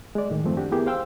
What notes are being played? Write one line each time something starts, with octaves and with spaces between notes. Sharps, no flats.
G#3 D5
A2 D#3
F#2 F3 A3 C4
D4 F#4 G4
B3 E4 G4 G#4 A#4
C5 F5 G5 C6 E6